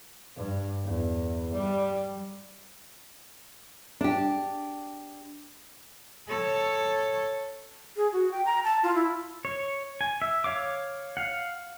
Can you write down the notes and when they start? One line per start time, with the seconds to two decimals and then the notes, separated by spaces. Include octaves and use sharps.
0.36 G2
0.84 E2
1.53 G3
4.01 D4 G4
6.29 A4 C#5
7.96 G#4
8.12 F#4
8.32 G5
8.45 A#5
8.64 A5
8.83 F4
8.95 E4
9.45 C#5
10.01 G#5
10.22 E5
10.44 C#5 F5 D6
11.17 F5 F#5